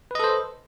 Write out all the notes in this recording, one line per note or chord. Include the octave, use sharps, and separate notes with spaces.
A4 B4 C5 D#5